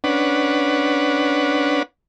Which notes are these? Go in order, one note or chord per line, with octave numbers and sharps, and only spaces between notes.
C#4 D4 B4 F#5